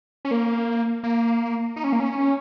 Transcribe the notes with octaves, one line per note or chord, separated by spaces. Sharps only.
C#4
A#3
A#3
D#4
C#4
A#3
C#4